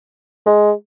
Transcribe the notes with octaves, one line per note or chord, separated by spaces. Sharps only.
G#3